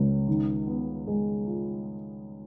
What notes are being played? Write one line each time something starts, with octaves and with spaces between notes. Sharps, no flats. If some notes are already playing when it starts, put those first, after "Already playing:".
Already playing: C#2 C#3
D#3
B3
G#3
F4